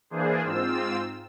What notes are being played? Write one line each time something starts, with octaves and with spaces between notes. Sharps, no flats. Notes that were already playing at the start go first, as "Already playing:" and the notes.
E3 A#3 D4 G#4 C5
G#2 C4 F4 E6